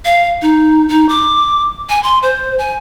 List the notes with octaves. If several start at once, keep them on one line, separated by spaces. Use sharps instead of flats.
F5
D#4
D#4
D6
G#5
C6
C5
G#5